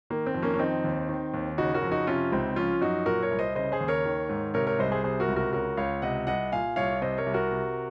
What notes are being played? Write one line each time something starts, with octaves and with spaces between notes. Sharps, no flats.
D#3 A#3
C4
F2
A#3 C#4
C#4
D#3 C4 D#4
D#2
D#3
D#2
C#3 D#4 F#4
F#4 A#4
F2
D#4 F#4
C3 C#4 F4
C#2 C4 D#4
F3 C#4 F4
F#2 D#4 F#4
A#2 F#4 A#4
A#4 C#5
C2
C5 D#5
C#3 C5 D#5
G#4 C5
D#2
A#4 C#5
D#3
G#2
C3 A#4 C#5
A#4 C#5
C2 C5 D#5
G#4 C5
C3 G#4 C5
F#4 A#4
C#2
F#4 A#4
C#3 F#4 A#4
C#2 C#5 F5
C3 D#5 F#5
C2 D#5 F#5
A#2 F5 G#5
C2 C#5 F5
C3 C5 D#5
A#4 C#5
C2
F#4 A#4
C3